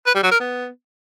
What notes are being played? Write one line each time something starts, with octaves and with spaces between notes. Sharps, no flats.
B4
G3
F#3
A#4
B3